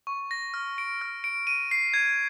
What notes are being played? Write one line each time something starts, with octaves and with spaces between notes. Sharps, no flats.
C#6
A#6
F6
D7
F6
D7
D#7
C7
G#6